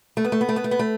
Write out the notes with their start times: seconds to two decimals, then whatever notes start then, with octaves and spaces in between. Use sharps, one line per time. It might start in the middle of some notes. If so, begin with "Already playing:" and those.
0.17 A3
0.25 B3
0.32 A3
0.41 B3
0.49 A3
0.56 B3
0.64 A3
0.71 B3
0.79 A3